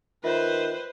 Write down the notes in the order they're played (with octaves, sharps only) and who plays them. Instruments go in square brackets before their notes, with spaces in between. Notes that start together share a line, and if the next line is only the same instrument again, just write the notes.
[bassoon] D#3 [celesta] F4 E5 [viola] B4 C5